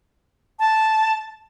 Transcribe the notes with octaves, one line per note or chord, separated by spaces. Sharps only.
A5